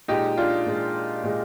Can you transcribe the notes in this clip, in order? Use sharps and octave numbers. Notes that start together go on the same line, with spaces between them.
A#2 G#3 D#4 G4
D4 F4
A#2 G#3
A#2 G#3